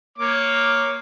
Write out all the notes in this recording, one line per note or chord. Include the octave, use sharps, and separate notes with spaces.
A#3 C#5 D6